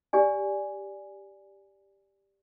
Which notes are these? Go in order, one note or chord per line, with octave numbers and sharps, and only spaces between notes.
G4 D5 G#5